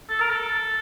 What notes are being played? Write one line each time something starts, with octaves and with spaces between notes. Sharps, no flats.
A4
A#4
A4